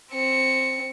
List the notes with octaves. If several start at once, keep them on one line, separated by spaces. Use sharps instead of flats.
C4 C#7